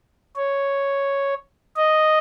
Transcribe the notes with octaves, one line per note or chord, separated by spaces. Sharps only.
C#5
D#5